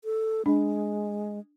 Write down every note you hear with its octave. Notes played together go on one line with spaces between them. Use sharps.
A4
G#3 D4